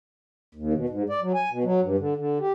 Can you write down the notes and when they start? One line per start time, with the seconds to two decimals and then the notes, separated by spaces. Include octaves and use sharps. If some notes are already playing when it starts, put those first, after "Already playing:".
0.55 D#2
0.74 B2
0.89 G#2
1.09 D5
1.21 F#3
1.34 G#5
1.50 B2
1.64 F#3
1.81 G2
1.98 D3
2.16 D3
2.39 G4